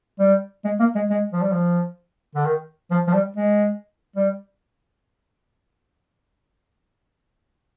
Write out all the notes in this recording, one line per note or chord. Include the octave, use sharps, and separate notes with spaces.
G3
G#3
A#3
G#3
G#3
F3
G3
F3
D3
D#3
F3
F3
G3
G#3
G3